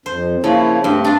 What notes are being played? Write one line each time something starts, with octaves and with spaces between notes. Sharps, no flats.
F2 C5
C#3 F3 A#3 E4 C#5
G2 A3 C4 G4
D4 F4